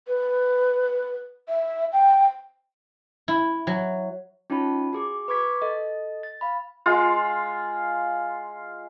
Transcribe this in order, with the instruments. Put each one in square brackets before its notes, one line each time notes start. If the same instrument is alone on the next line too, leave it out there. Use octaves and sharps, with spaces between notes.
[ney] B4
E5
G5
[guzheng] E4
F#3
[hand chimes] C#4 D#4 F4 C#5 A5 B5
F#4 G#4 D6
B4 C#6 D6 G#6 B6
A4 D#5
A6
F5 B5
[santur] G#3 F4